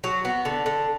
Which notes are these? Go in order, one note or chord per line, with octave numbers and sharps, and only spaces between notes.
F#3
B3
D3
D3